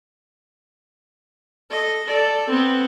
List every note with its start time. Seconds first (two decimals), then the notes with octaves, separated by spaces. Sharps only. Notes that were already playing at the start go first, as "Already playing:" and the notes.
1.71 A4 D#5
2.05 A4 D5
2.50 B3 C4